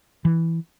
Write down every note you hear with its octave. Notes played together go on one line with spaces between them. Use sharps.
E3